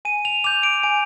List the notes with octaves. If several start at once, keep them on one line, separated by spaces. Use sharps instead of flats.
G#5 D#7
F7
D6 G6 F7
D7
G#5 D7